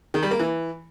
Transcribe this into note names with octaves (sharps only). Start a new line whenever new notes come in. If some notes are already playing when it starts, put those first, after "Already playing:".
D#3
G3
A#3
E3